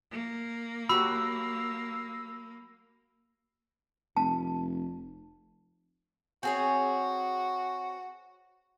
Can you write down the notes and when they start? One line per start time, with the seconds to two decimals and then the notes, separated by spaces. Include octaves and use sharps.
0.11 A#3
0.89 F#3 F#4 G4 B5 E6
4.17 F1 A5
6.43 C4 F#4 G#4 C#5